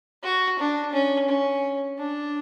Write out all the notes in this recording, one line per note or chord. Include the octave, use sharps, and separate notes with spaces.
F#4
D4
C#4
C#4
D4